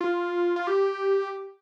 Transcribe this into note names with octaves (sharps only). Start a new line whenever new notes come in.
F4
F4
G4